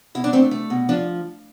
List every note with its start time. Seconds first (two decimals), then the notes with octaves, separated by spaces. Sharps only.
0.15 B2 E4
0.24 D4
0.33 A3 C4
0.51 A3
0.70 B2
0.89 F3 D4